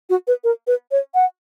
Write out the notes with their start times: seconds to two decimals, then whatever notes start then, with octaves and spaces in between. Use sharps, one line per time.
0.10 F#4
0.27 B4
0.44 A#4
0.67 B4
0.91 C#5
1.14 F#5